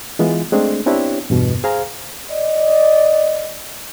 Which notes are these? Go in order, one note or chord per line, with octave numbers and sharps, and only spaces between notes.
E3 G#3 B3 F4
G#3 A3 C4 D4 G#4
B3 C4 D4 E4 G4 C#5
E2 G2 B2
G#4 C5 F5 G#5 A#5
D5 D#5